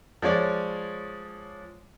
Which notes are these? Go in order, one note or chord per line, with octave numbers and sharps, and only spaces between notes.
F3 G#3 C#5 D5